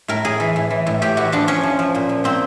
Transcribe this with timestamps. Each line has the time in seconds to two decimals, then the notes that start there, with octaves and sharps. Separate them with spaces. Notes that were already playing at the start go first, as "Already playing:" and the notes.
0.08 A2 A#4
0.25 A2 G#4
0.40 E3
0.56 A2
0.70 E3
0.87 A2
1.02 A2 G4
1.17 E3 F#4
1.32 F3 D4
1.47 F3 C#4
1.63 F3
1.79 F3
1.95 A#2
2.09 F3
2.24 A#2 C4